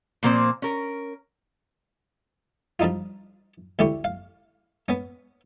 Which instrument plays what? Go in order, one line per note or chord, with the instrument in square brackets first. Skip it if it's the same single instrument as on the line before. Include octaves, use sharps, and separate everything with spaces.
[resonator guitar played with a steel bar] A#2 F3 A#3 C4 C5
C#4 A#4
[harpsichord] F3 G3 D4 D#4 F4
D2 D3 E4 G4 C#6
F5
B3 C#4